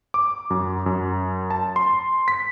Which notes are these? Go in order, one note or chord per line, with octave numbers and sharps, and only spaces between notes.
D6
F#2
F#2
A5
C6
B6